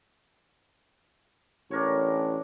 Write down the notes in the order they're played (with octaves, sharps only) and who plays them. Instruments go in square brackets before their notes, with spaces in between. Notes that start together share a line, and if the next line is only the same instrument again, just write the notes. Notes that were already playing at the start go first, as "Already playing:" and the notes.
[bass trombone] A1 [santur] D4 A#4 C#5